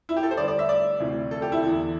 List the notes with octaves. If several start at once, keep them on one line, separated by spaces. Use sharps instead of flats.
E4
G4
A4
C5
G2 D3 D5
D5
E5
D5
D2 C3 E3
A4
G4
E4
E2 D3